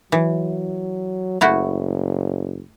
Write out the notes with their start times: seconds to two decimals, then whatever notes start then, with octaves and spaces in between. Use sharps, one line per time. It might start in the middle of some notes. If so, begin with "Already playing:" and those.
0.12 E3 F#3
1.41 F#1 A3 E4 F#4